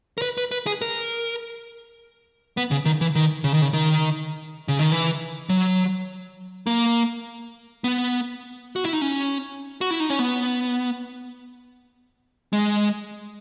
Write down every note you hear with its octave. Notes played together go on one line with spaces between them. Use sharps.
A#4
B4
B4
B4
G#4
A#4
B3
C#3
D#3
E3
D#3
C#3
D#3
C#3
D#3
C#3
D#3
E3
F#3
A#3
B3
F#4
E4
D#4
C#4
F#4
E4
D#4
C#4
B3
G#3